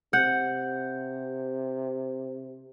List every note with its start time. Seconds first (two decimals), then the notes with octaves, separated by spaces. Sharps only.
0.13 C3 F#5 G6